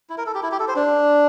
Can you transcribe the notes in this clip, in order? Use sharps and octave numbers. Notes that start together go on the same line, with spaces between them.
E4
A#4
A4
G4
E4
G4
A4
C5
D4